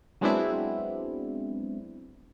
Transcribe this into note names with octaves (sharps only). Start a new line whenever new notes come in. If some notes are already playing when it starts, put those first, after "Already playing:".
F#3 G#3 B3 C4 D4 E4